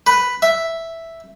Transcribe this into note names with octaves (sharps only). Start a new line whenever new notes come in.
B4
E5